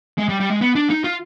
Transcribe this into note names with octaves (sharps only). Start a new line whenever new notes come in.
G#3
G3
G3
G#3
B3
D4
D#4
F4